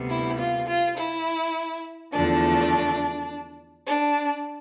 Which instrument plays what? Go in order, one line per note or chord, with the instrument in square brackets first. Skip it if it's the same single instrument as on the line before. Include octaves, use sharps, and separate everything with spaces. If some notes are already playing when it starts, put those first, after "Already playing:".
Already playing: [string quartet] D2 C3 G3 B3
E4
F4
F4
E4
E2 D3 F3 A3 D4
D4